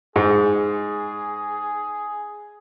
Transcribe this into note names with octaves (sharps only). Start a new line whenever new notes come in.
G#2 G#4